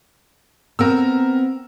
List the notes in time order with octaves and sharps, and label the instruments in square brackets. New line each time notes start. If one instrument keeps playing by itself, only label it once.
[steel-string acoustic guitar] B3 C4 [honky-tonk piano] A#4 E6